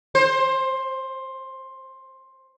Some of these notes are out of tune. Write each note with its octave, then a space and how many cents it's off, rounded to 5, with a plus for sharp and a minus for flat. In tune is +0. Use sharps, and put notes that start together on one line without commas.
C5 +15